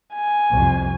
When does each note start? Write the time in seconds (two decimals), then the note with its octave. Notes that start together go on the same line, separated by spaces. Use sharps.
0.15 G#5
0.51 C2 F2